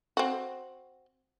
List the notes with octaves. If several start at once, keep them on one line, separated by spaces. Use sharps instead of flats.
C4 F#4